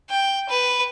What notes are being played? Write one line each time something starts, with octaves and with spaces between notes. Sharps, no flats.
G5
B4